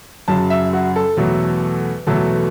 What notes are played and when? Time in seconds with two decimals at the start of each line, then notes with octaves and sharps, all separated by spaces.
0.28 F#2 C#3 F#3 A5
0.50 E5
0.73 F#4
0.96 A4
1.17 E2 B2 F#3 A3
2.07 E2 B2 F#3 A3 A4